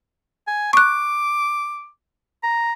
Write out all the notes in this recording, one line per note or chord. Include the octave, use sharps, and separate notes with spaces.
G#5
C#6 D6 F#6
A#5